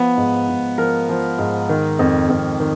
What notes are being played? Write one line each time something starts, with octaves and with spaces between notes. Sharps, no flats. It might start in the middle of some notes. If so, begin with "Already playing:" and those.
Already playing: F3 B3
G#2
G#2
F3 A#4
F3
G#2
D#3
F2
F2
D#3